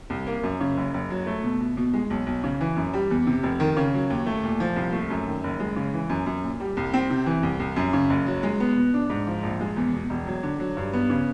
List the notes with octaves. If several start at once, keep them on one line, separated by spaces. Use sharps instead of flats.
C2
A#3
F#2
C#3
F#1
F#1
F#3
A3
B2
B2
B2
G#3
B1
B1
C#3
E3
F#2
G3
E2
C3
F1
D#3
C#3
F#3
D#2
A3
A#2
F3
C2
A3
F#2
D#3
F#1
G#3
C#3
E3
F#2
F#2
A#2
G3
C2
C4
C3
E3
C2
C2
F#2
C#3
F#1
F#3
G#3
B3
B2
D4
G#2
F3
A#1
G#3
E2
B2
E1
F#3
D3
F#3
G2
B3
C#3